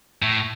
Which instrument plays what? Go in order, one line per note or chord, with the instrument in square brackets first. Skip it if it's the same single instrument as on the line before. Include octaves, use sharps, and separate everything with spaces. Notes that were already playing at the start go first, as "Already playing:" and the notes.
[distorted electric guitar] A2